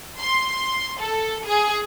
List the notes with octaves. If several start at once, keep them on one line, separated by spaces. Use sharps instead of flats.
C6
A4
G#4